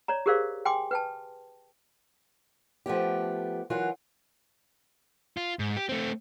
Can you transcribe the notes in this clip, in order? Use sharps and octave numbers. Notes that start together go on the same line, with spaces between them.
C#5 D5 A#5
G4 G#4 A#4 C5 D5 F5
G5 G#5 C6 D6
B4 G5 A5
F3 A3 B3 G4
E3 F#3 F4 F#4 A#4
F4
G#2
G4
A3 C4